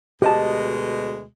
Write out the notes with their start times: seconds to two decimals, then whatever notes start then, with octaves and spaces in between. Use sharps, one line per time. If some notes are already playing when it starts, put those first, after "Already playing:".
0.22 D2 B2 G#3 G4 D#5 A5